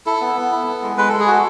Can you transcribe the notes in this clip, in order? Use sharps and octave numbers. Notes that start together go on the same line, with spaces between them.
E4 A4
B3
B3
E4
B3
G#3
G#3 B4
G#3 A4
G#4
F#4 A4